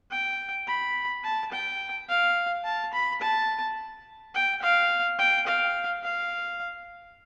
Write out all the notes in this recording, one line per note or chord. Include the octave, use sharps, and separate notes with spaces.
G5
B5
A5
G5
F5
A5
B5
A5
G5
F5
G5
F5
F5